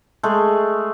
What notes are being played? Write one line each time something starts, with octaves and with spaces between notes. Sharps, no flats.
G#3 A3